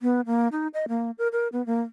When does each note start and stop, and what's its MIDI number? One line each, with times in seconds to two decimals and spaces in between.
0.02 0.21 59
0.26 0.48 58
0.52 0.67 63
0.74 0.85 75
0.88 1.11 58
1.18 1.28 70
1.32 1.48 70
1.52 1.65 59
1.66 1.82 58